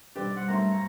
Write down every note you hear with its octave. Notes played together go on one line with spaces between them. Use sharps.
B1 G3 C4 G4 B4 D5
F#1 F#5 C6
B1 A3 A#4 C5 A#5 C6
G2 C#7